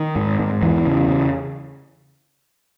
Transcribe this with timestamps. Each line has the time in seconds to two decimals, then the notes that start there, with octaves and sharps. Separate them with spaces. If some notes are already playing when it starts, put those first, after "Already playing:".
Already playing: D#3
0.16 G#2
0.40 G#2
0.62 E2 E3
0.86 C#3
1.08 C#3